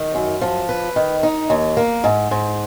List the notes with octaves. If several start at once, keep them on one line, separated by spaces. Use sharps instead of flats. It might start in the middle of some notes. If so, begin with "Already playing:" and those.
Already playing: D#3
F#2
F3
B4
D#3
D#4
D#2
A#3
G#2
G#2